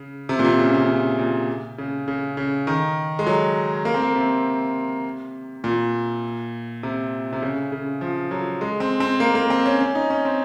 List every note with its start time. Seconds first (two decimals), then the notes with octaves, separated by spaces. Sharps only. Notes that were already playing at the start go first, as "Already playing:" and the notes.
Already playing: C#3
0.29 C3
0.39 A#2
0.45 C3
0.59 C#3
0.74 C#3
0.88 C#3
1.19 A#2
1.78 C#3
2.08 C#3
2.37 C#3
2.67 D#3
3.19 G#3
3.27 F#3
3.85 A#3
3.94 C4
4.02 A#3
4.15 C3
5.64 A#2
6.83 C3
7.33 C3
7.42 C#3
7.72 C#3
8.01 F3
8.31 F#3
8.61 G#3
8.80 C4
9.00 C4
9.20 A#3
9.35 A#3
9.50 C4
9.66 C#4
9.81 C#4
9.95 D#4
10.10 C#4
10.25 C4